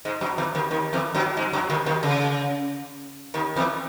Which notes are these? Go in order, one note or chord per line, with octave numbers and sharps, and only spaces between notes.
G#2 G#3
F#2 F#3
E2 E3
D#2 D#3
D#2 D#3
E2 E3
F#2 F#3
G#2 G#3
F#2 F#3
D#2 D#3
D#2 D#3
C#3
D#2 D#3
E2 E3